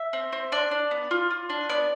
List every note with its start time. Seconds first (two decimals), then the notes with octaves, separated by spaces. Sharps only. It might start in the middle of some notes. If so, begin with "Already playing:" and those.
Already playing: E5
0.13 C4
0.33 C4
0.52 D4 D5
0.71 D4
0.91 B3
1.11 F4
1.30 F4
1.50 D4
1.69 B3 D5